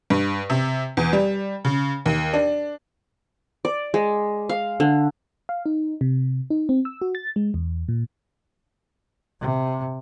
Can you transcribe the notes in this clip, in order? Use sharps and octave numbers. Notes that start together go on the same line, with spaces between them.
G2
C3
E2
G3
C#3
D#2
D4
D5
G#3
F5
D3
F5
D#4
C3
D#4
C4
E6
F#4
A6
G#3
E2
A#2
C3